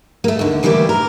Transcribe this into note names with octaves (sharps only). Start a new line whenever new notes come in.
A3 A#3
D#2 D3
D2 E3 G3 A#3 G4
A#4